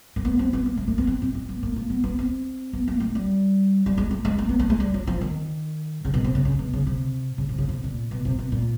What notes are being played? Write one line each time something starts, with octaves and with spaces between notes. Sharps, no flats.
A#3
B3
C4
B3
A#3
A3
A#3
B3
C4
C4
C4
B3
A#3
A#3
B3
B3
C4
B3
A#3
A3
G3
G3
G#3
A3
G#3
A#3
B3
A3
G#3
G3
F#3
F3
D#3
C#3
B2
C3
C#3
C#3
B2
C#3
C3
C#3
C3
C#3
C3
A#2
B2
C3
B2
A#2